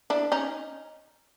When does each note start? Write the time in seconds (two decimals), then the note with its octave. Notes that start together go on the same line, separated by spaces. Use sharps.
0.10 D4 E4
0.32 C#4 D#4